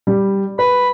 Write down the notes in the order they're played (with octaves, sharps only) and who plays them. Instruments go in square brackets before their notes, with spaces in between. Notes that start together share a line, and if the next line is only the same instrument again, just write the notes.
[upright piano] G3
[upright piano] B4 [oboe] B5